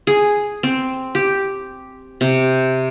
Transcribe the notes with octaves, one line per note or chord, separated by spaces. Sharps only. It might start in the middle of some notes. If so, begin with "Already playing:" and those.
G#4
C4
G4
C3